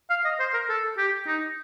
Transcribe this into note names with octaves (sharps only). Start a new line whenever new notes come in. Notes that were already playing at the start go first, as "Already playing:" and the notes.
F5
D#5
C5
A#4
A4
G4
D#4